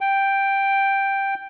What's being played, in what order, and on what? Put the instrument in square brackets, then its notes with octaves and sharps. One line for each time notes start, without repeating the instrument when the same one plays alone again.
[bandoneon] G5